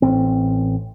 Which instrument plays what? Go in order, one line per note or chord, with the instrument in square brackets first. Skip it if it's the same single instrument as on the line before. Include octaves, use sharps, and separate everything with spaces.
[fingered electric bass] A1 C4